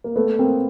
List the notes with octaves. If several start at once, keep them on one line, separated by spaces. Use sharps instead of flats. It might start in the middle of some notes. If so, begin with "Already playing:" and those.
A#3
A3 B3
A#3 C4